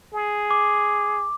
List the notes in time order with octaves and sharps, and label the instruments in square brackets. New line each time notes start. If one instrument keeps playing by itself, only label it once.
[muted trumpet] G#4
[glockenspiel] D6